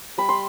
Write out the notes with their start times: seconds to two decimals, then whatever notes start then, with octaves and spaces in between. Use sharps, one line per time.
0.18 G3 B5
0.29 C6